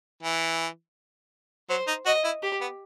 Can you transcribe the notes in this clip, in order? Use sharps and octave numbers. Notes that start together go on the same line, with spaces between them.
E3
F#3 C5
D#4
F#4 D#5
E4
G4
B3